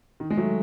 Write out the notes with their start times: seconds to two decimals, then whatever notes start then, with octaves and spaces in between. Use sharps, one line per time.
0.20 D#3
0.30 G#3
0.37 F#3 A3